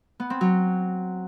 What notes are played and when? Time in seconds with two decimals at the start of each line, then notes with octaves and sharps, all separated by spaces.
0.20 B3
0.30 C4
0.41 F#3